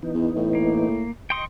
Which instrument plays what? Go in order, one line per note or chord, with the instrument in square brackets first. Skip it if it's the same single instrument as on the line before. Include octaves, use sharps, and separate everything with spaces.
[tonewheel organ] E3 B3 D#4
[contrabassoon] E2
A2
[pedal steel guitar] A#3
[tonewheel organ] D#5 C#6 [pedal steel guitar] G5 C6 D#6